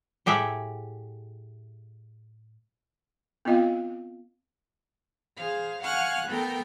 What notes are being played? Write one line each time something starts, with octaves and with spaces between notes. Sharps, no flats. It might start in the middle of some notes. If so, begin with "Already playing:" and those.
A2 G4 G#4 E5 F#5
B3 C4 F4 D#5 F5 G5
G#4 C5 F5
F5 F#5 G#5 C#6 F6 F#6
A3 B3 A4 A#4 G5